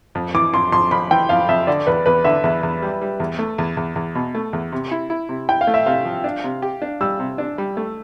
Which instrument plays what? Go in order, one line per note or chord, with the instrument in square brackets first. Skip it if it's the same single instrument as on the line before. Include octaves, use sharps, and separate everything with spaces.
[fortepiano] F2
[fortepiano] E3 [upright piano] D6
[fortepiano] F2 [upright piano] C6
[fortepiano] F2 [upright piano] C6
[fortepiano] F2 [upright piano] B5
[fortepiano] E3 [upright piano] G5
[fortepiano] F2 [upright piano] F5
[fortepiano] F2 [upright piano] E5
[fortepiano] D3 [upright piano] D5
[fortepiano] E2 [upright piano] B4
[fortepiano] E2 [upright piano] B4
[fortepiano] D3 [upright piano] E5
[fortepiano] E2 [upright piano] E5
[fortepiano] E2
G3
G3
E2
A3
E2
E2
E2
B2
A3
E2
C3
E4
E4
C3
[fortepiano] E4 [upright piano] G5
[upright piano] F5
[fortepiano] A3
[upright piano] E5
[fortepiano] C3 [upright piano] F5
[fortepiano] F3
D4
C3
G4
D4
[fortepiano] G3 [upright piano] E6
[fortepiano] C3
D4
G3
A3